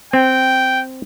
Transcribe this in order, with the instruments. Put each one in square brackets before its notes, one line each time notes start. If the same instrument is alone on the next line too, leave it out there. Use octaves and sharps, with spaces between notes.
[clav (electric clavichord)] C4 [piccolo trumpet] G5